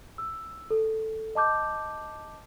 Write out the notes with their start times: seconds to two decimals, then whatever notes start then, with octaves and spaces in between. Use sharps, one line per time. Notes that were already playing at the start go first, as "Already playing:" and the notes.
0.18 E6
0.71 A4
1.35 D#5 A5 D6 G6